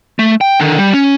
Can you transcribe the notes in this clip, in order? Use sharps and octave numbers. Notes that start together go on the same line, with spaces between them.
A3
G5
D3 D#3
G3
C#4